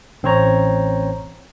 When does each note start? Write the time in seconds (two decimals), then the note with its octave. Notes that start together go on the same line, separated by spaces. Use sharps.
0.23 A1 C4 C#4 C5 C#5 A#5